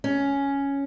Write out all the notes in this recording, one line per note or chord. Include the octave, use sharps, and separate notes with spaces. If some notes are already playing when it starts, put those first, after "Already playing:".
C#4